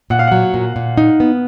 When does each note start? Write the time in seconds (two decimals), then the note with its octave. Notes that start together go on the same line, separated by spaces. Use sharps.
0.10 A#2 F#5
0.19 F5
0.27 F#3 F#5
0.54 A#2
0.76 A#2
0.97 D#4
1.20 B3